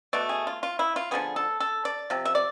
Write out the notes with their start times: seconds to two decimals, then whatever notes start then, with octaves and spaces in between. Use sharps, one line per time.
0.13 B2 A3 D5
0.29 G#4
0.47 F4
0.63 F4
0.79 E4
0.96 F4
1.11 D3 F3 B3 G#4
1.36 A4
1.60 A4
1.85 D5
2.10 C3 F3
2.25 E5
2.35 D5